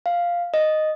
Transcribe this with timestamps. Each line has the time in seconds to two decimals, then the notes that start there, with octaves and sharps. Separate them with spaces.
0.06 F5
0.54 D#5